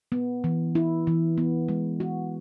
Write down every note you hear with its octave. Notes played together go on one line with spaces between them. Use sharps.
B3
E3
E4
E3
B3
G#3
F#4